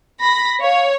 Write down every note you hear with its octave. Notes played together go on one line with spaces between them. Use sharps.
B5 A#6
C#5 F5